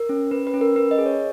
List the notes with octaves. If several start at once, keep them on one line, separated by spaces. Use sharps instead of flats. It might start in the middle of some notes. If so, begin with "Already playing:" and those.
Already playing: A#4
C#4
C#4 B4
B4
C#4
A#4
C#4 B4
D#5
G#4
C#5